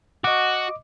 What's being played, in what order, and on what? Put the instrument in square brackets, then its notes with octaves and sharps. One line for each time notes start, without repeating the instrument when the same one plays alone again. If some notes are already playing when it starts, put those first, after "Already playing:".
[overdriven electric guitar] F#4 [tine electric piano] D#5 D6